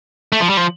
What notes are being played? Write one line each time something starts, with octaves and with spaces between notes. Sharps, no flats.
A3
F3
G3
F3